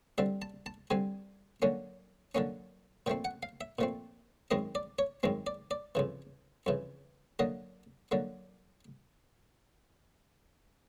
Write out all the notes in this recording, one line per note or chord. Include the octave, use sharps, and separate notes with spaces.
D3 G3 C4 E5
A5
A5
D3 G3 C4 G#5
D3 F#3 A#3 C#4
D3 F#3 A#3 C#4
A#2 F3 A3 C4 G5
F#5
F5
E5
A#2 F3 A3 C4
F#2 D#3 G#3 C4 D#5
D5
C#5
F#2 D#3 G#3 C4
D5
D5
F2 C#3 E3
F2 C#3 E3
D3 F#3 A#3 D#5
D3 F#3 A#3